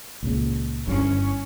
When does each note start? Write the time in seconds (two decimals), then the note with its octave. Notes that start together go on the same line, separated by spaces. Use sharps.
0.23 C#2 A#2 C#3
0.87 G1 G2 C#4 E4